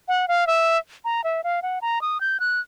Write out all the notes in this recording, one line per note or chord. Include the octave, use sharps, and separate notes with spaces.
F#5
F5
E5
A#5
E5
F5
F#5
A#5
D#6
G6
F#6